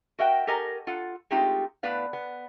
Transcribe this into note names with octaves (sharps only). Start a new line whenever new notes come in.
F#4 A#4 D#5 E5 F#5 G5
G4 A4 A#4 D#5 G#5
F4 A4 F#5
G#3 A3 C4 D#4 F4 G4
A2 B3 B4 D5 F5
B3